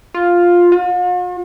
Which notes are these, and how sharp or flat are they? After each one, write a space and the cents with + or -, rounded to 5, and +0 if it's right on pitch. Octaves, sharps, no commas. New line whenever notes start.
F4 +5
F4 +45